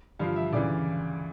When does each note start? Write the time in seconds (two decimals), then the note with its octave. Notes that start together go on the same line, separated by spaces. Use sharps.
0.19 G2 D3 F3 F5
0.36 E5
0.53 D2 C#3 E3 D5